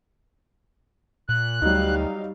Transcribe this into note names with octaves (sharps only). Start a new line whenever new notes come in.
A#2 F#6
D2 F#3 G3 D#4 F5